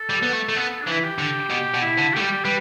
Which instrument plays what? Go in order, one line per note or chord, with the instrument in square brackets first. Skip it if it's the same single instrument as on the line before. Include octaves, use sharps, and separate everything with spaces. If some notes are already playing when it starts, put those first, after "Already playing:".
Already playing: [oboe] A4
[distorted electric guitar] G3
B3
A3
A3
[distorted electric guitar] B3 [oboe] A4
[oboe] D4
[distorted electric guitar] E3
[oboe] E4
G4
[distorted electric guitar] D3
[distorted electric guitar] B2 [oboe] G4
[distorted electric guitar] B2
[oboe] E4
[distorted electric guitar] D3
[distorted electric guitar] A3 [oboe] G4
[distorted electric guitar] G3
[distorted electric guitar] G3 [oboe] B4